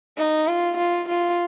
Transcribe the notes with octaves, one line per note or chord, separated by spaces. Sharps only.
D#4
F4
F4
F4